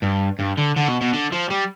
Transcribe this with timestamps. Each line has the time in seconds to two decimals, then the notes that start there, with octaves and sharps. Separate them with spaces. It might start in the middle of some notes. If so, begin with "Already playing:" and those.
0.03 G2
0.40 G2
0.58 D3
0.77 D3
0.88 B2
1.01 B2
1.13 D3
1.32 F3
1.51 G3